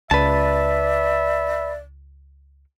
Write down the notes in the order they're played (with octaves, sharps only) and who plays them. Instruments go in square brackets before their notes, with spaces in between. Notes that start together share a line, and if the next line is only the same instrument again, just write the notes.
[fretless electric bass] C#2 [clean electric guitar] B4 A5 [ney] D5 [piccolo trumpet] E5